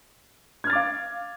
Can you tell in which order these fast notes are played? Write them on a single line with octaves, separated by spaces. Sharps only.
G#6 F6 A6 D6 F5